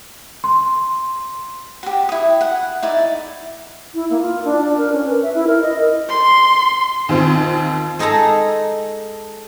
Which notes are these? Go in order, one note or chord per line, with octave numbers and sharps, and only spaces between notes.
C6
F#4 G4
E4 D#6
F#5
D#4 E4 D5
E4
A#3
F4
D4
D4
A#4
C#4
B4
E5
E4
A#4
D#5
C6
D#2 C4 F4
G#3 D#4 G#4 A4 A#5